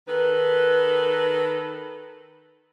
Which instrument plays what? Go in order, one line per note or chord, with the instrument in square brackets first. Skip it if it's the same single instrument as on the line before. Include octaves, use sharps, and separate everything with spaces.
[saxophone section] D#3 A4 B4